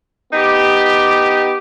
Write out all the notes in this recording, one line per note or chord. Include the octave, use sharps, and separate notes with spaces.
B3 D#4 G4